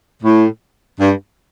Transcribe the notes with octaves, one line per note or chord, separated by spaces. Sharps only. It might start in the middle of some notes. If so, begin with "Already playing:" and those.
A2
G2